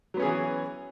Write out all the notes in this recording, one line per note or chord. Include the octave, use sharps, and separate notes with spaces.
E3 F#3 B3 C#4 G#4